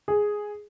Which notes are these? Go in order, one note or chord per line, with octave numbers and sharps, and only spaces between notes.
G#4